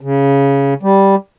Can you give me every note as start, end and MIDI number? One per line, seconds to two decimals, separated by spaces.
0.01 0.74 49
0.83 1.15 55